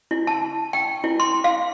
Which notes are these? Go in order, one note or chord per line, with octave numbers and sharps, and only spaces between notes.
E4
A5
G5
E4
C6
F5